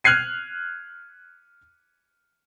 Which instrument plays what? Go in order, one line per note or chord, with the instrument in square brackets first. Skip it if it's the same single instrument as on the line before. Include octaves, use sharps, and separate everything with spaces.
[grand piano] F6 F#6 G#6 C7 D#7